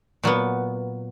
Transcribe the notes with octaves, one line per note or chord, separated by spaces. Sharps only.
A#2 F#3 B3